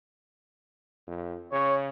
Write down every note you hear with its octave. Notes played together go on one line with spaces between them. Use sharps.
F2
C#3 C#5